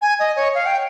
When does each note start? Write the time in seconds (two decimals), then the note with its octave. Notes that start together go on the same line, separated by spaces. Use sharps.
0.02 G#5
0.19 D#5
0.36 C#5
0.55 F5
0.66 G5